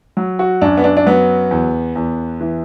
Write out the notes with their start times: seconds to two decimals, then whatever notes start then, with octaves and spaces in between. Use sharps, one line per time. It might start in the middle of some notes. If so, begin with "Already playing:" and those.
0.17 F#3
0.39 F#4
0.62 F#2 D4
0.77 B3
0.84 D4
0.97 D4
1.06 F#3 B3
1.51 E2
1.95 E2
2.41 E3